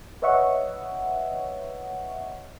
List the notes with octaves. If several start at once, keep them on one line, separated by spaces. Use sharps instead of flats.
B4 C#5 D#5 E5 F#5 C#6